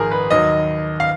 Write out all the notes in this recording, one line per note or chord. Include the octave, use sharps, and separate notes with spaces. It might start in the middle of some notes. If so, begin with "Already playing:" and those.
Already playing: G#1 G#2 F3 G#4 A#4
B4
D#2 D#3 F#3 D#5
F5